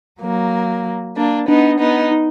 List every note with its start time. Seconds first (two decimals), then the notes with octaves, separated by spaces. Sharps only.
0.20 F#3 A#3
1.16 A#3 D4
1.47 B3 D4 D#4
1.79 B3 D#4
2.12 D#4